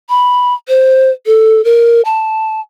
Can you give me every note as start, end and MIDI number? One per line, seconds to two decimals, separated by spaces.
0.09 0.54 83
0.68 1.10 72
1.26 1.63 69
1.64 2.01 70
2.05 2.60 81